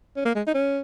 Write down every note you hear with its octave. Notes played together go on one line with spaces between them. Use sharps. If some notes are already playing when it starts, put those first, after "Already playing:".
C#4
A#3
G#3
D#4
C#4